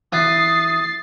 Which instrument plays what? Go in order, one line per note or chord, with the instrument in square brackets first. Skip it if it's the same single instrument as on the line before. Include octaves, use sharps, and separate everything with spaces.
[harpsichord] E3 [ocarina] D#6 [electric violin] A6 C7